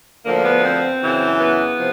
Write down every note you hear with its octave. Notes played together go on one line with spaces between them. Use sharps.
D2 D3 F3 A#3
B3
C4
F#2 C#3 E3
B3
C3 F3